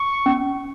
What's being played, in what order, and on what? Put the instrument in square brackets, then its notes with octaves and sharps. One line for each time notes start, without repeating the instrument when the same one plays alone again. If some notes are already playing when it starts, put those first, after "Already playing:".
Already playing: [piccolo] C#6
[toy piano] C#4